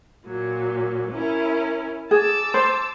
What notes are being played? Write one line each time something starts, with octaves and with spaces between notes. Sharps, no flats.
A#2 F#3
C#4 E4 A#4
G#4 A5 D6 E6
C5